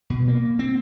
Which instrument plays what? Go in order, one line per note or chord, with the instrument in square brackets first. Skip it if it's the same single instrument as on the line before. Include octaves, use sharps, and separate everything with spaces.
[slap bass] B2
A#3
C4